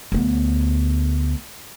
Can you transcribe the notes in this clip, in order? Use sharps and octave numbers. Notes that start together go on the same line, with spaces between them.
D2 B3